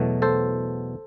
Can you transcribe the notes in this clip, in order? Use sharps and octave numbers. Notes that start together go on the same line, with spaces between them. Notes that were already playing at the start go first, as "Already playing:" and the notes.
Already playing: E2 B2 F#3 A3
A4 C5